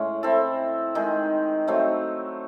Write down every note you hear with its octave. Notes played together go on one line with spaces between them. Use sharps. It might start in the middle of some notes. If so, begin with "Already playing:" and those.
Already playing: A2 G#3 C#4
C4 E4 A4
D#3 G#3 D#4
F#3 A3 C4 D#4